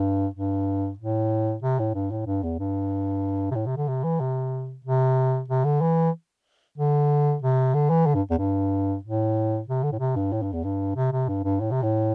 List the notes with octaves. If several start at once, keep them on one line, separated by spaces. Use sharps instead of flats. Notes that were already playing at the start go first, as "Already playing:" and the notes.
Already playing: G2
G2
A2
C3
A2
G2
A2
G2
E2
G2
C3
A2
C3
D3
C3
E3
C3
C3
C3
D3
E3
D3
C3
D3
E3
D3
G2
E2
G2
A2
C3
D3
A2
C3
G2
A2
G2
E2
G2
C3
C3
G2
G2
A2
C3
A2